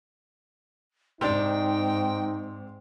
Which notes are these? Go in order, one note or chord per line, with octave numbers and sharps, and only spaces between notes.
G#2 C3 C4 D4 D#4 G5